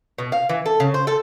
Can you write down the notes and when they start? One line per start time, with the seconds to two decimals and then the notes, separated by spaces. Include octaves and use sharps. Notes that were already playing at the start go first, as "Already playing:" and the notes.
0.18 B2
0.32 F5
0.49 E3
0.66 A4
0.80 C#3
0.94 C5
1.07 A4